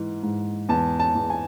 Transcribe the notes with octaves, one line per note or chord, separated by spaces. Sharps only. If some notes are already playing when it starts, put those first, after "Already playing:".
Already playing: G#2 E3
G#2
E2 A5
A5
E2
G#5